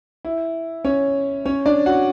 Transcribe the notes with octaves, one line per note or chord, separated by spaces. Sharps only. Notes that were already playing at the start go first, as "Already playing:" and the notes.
E4
C#4 C#5
C#4 C#5
D4 D5
F#4 F#5